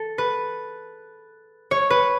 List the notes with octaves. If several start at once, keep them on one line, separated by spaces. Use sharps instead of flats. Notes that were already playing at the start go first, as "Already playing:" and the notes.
Already playing: A4
B4
C#5
B4